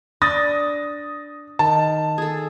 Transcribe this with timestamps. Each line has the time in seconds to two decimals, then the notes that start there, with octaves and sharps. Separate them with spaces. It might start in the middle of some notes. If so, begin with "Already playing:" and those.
0.22 D4 D#6 A6 A#6
1.59 D#3 A5
2.18 G#4 A4